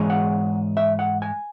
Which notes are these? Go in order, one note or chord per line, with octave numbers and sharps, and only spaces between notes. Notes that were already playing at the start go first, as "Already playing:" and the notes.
Already playing: G#2 E3 G#3 C#4
F#5
E5
F#5
G#5